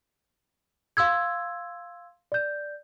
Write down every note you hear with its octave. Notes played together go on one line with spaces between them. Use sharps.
F5 C6 E6 G#6
D5 G6